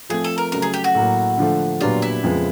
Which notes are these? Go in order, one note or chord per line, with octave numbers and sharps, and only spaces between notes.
F3 A3 C4 G#4
A4
A#4
C#3 F#3 A3 A#4
G#4
G4
F#4
A2 F#3 A#3
D3 F3 A3
A#2 F#3 B3 D4 F4 G4
E4
F2 C#3 F3 G#3 B3